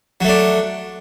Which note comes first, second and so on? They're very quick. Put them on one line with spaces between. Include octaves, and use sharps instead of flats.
F#3 A3 D4